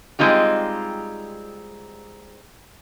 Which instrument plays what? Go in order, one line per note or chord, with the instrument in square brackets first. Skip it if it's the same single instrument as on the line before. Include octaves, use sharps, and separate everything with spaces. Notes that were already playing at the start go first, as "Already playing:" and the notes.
[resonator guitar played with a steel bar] G3 G#3 C4 D#4 F4 G4